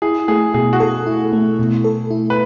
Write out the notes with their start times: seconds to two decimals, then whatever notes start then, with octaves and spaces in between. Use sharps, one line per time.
0.02 E4 G#4
0.28 A3 G#4
0.54 B2 G#4
0.73 F#4
0.80 G#4 A4
1.06 E4
1.33 A3
1.59 B2
1.84 A4
2.11 E4
2.30 B4